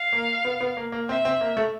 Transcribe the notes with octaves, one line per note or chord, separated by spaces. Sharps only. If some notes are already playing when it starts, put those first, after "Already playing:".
Already playing: F5
A#3
B3
B3
A#3
A#3
C4 E5
C4
A#3
A3